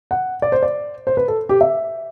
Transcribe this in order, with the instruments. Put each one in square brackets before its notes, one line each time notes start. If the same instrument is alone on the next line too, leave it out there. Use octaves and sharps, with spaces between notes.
[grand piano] F#5
D5
C5
D5
C5
B4
A4
G4
E5